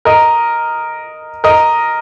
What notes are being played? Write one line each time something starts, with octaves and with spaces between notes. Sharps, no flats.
A#4 D#5
A#4 D#5